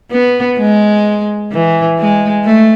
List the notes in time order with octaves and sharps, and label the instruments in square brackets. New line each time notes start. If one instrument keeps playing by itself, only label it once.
[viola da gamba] B3
G#3
E3
G#3
A3